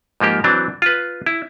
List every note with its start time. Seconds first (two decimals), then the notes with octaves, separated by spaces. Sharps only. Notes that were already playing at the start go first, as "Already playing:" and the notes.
0.20 G#2 F3 A#3 G4
0.44 E3 F#3 C4 D4
0.82 F4 B4
1.26 E4